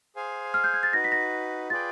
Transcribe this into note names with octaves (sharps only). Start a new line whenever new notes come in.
G#4 C5 F5 G#5
F6
G6
G#6
A6
D#4 F#4 B4 A#6
B6
A#6
F4 G#4 B4 D5 G5 A6